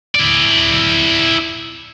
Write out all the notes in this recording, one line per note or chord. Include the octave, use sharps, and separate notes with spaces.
E4 D5